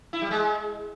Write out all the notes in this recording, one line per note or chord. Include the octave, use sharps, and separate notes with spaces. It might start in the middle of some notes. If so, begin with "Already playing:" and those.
E4
G3
G#3